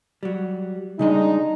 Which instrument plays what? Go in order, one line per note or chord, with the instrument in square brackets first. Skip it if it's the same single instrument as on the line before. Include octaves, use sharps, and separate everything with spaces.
[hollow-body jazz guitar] F#3 G3
[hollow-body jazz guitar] C#3 G3 D#5 [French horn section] G#3 D4 D#4